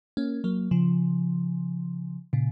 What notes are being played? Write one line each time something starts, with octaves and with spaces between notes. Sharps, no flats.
A#3 C#4
F#3 A#3
C#3 F3
A#2 C#3